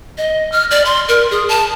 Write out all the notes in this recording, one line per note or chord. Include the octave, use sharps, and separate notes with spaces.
D#5
F6
D5
C6
A#4
G#4
A5